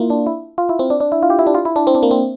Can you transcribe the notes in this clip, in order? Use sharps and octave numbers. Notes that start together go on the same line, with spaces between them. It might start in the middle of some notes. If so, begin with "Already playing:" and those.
Already playing: A#3 E4 F4
D4
E4
F4
E4
C4
D4
D4
E4
F4
G4
E4
D4
F4
E4
D4
C4
D4
A#3
C4